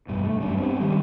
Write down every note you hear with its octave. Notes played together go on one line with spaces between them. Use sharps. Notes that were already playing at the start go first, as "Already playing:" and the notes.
G2 B2
A3
G2 F#3 C#4 D4
G3 B3 C4
D#3 G3 G#3 C#4